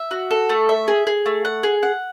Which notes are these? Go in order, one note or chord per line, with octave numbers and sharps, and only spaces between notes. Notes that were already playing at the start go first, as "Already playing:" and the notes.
Already playing: E5
F#4
A4
A3
E5
G#4
G#4
A3
F#5
G#4
F#5